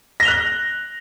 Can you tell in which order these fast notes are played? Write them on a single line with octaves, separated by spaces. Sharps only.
A#6 G7 F7 F#6